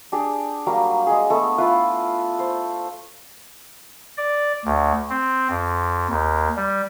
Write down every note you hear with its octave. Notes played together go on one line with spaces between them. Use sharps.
D4 G4 G#4
F#3 G3 A#3 F5
G#3 G#4
A3 B3 A4
E4 F4 B4
C5
D5
D2
C4
F2
D#2
G3